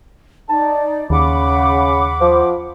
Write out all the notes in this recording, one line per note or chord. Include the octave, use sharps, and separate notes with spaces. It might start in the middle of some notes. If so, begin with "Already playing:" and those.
D#4 D5 A5
D#2 C#3 F#5 B5 D6
F3